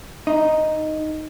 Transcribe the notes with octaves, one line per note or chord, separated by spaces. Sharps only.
D#4